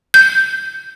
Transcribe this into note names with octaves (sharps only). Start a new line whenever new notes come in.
G6